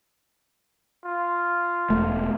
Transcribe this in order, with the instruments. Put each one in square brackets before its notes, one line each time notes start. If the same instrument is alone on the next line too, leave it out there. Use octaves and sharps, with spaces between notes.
[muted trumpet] F4
[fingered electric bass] E1 A3